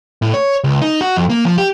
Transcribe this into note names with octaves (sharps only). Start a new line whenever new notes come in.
A2
C#5
C#2
D#4
F#4
F2
A#3
F3
G4